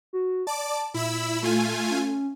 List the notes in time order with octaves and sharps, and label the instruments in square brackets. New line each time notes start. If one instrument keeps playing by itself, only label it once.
[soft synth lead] F#4
[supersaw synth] D5 D6 [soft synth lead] A5
[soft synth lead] A#2 [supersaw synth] E4 B5 E6
[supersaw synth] A3 F4 G#5
[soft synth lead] C#4